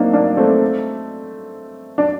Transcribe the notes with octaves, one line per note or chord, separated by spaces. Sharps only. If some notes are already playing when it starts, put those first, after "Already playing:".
Already playing: F#3 A#3 C4 D4 D#4
A#3 D4
A3 C4
D4